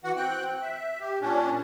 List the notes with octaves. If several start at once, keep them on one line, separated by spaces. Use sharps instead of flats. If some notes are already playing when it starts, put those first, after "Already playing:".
E3 F#4 F#5
C4 G5 F#6
E5
G4
A#2 C#4 D4